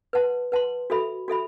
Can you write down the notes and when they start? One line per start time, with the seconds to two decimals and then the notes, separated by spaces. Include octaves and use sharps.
0.13 B4 F#5 A5 C6
0.52 B4 F#5 A5 C6
0.90 F#4 A4 E5 B5
1.28 F#4 A4 E5 B5